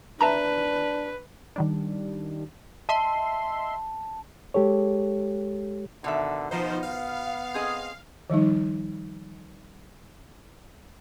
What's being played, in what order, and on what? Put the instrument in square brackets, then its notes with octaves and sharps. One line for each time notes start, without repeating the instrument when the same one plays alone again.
[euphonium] D4 [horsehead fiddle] B4 [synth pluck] E5 A5 A#5
[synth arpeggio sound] D#3 G3 D4
[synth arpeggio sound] D#5 E5 C6 [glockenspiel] A5
[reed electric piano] G#3 G4 A4 C#5
[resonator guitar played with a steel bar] B2 D#3 E5 [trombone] D3
[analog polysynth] F3 D#4 C5 [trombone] B3
[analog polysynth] F5
[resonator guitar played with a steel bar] C4 G#4 D#5
[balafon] D#3 F3 G3 D#4